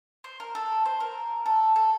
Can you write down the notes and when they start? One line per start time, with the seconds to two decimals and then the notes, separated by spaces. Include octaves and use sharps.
0.24 C5
0.40 A#4
0.55 A4
0.86 C5
1.00 A#4
1.46 A4
1.76 A4